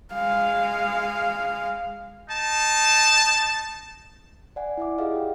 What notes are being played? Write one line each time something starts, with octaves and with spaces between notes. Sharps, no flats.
G#3 F5
D#4 A5
D5 F#5 G#5
E4 E5 D6
F4 G4 G#4 D#5 F5 F#5
G5